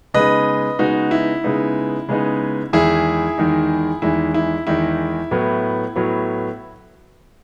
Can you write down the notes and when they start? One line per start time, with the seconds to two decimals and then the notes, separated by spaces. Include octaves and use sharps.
0.14 C#3 G#3 B3 D#4 B4 D#5
0.79 C#3 G#3 B3 D#4 F#4
1.11 E4
1.44 C#3 G#3 B3 D#4
2.09 C#3 G#3 B3 D#4
2.73 E2 D#3 G#3 D#4 E4 G#4
3.38 E2 D#3 G#3 D#4
4.02 E2 D#3 G#3 D#4 E4
4.34 E4
4.67 E2 D#3 G#3 D#4 E4
5.31 A2 F#3 B3
5.96 A2 F#3 B3